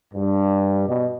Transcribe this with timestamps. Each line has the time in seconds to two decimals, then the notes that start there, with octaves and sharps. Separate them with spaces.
0.14 G2
0.88 B2